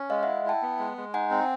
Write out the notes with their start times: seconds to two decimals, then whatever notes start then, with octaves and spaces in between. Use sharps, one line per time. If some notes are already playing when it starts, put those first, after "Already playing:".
Already playing: C#4
0.10 G#3 D#5 F5
0.23 E4 E5 F#5
0.45 E4 G5 A5
0.62 B3
0.79 G#3
0.97 G#3
1.14 D#4 F#5 G#5
1.31 C4